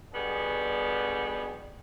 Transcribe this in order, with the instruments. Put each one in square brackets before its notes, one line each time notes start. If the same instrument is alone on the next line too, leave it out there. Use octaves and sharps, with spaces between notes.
[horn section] B2 D3 G3 B3 G#4